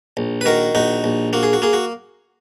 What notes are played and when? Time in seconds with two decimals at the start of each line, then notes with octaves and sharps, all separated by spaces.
0.17 A#1
0.41 B4
0.45 D#3 F#4 A#4
0.75 A#1 D#4 F#4
1.04 A#1
1.33 A#3 F#4
1.43 G#4
1.53 F#4
1.62 A#3 G#4
1.73 F#4